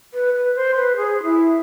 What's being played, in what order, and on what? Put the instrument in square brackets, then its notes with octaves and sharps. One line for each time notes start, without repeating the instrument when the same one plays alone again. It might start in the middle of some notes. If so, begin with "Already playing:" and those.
[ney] B4
B4
C5
B4
G#4
E4